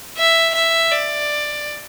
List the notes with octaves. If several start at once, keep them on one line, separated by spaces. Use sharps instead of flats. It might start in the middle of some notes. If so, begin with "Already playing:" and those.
E5
E5
D5